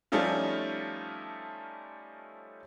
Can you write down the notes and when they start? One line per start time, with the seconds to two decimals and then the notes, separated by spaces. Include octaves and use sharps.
0.12 F3 G3 A3 C#4 D#4 F4